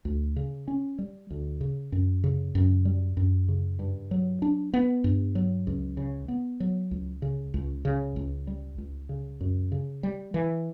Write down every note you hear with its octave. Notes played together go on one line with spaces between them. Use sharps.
D2
C#3
C#4
G3
D2
C#3
F#2
C#3
F#2
G3
F#2
C#3
G2
F#3
D4
B3
G2
F#3
C#2
C#3
B3
F#3
C#2
C#3
C#2
C#3
C#2
G3
C#2
C#3
F#2
C#3
G3
E3